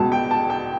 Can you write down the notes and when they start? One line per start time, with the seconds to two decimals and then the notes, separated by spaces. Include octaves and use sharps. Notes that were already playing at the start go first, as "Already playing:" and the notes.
Already playing: C#2 B2 A5
0.12 G5
0.31 A5
0.50 G5